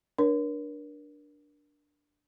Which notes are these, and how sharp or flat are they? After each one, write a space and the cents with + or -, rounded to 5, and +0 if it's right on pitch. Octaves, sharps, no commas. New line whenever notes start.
D4 +0 A#4 +30 C#5 +0